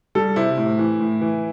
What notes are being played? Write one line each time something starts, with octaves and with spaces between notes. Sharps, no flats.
G3 A4
C3 E4
A2
E3
A2
E3